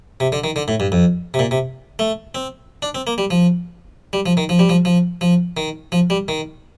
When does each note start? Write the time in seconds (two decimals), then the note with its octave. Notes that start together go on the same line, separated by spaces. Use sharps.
0.20 C3
0.32 D3
0.44 D#3
0.56 D3
0.68 A2
0.80 G2
0.92 F2
1.34 C3
1.39 A#2
1.51 C3
1.99 A3
2.35 C4
2.82 D4
2.95 C4
3.07 A#3
3.18 G3
3.31 F3
4.13 G3
4.26 F3
4.37 D#3
4.49 F3
4.59 G3
4.69 F3
4.85 F3
5.21 F3
5.57 D#3
5.92 F3
6.10 G3
6.28 D#3